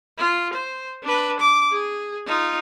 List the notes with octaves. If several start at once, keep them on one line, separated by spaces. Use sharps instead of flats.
F4
C5
D4 B4
D6
G#4
D#4 F4